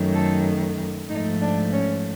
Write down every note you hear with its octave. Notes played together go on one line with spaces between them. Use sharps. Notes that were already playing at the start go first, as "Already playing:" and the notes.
Already playing: F#2 D#3 F#3 A3
A4
G#2 F3 A3 D#4
D4
C#4